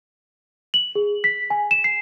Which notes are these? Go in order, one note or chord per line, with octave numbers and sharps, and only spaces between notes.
F#7
G#4
B6
G#5
E7
C7